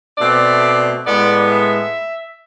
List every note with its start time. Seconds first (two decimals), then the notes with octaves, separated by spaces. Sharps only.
0.17 B2 A3 C4 D5
1.06 A2 G#3 B3 D5
1.51 E5